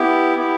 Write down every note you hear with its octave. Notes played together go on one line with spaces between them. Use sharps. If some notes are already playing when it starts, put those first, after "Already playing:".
Already playing: B3 E4 G4
B3 E4 G4